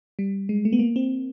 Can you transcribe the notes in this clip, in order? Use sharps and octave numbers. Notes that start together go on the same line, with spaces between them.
G3
G#3
A3
B3
A#3
C4